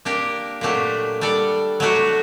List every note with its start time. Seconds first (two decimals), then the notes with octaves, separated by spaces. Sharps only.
0.05 A#3 D4 G4 A#4
0.61 A#2 F#3 A3 D4 G4
1.21 G3 D4 A4 D5
1.80 F#3 A3 D4 F#4